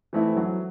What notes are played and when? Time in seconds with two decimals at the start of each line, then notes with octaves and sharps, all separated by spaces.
0.13 E3 A3 C4 E4
0.37 F#3